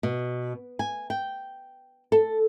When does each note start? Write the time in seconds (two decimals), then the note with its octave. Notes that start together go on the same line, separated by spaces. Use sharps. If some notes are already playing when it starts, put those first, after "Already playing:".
0.03 B2
0.79 G#5
1.10 G5
2.12 A4